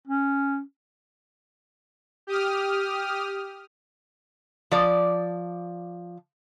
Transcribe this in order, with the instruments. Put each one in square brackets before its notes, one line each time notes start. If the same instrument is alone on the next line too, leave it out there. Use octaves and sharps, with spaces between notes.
[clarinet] C#4
[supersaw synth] G4 D#6 F6
[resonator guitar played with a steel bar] F3 D5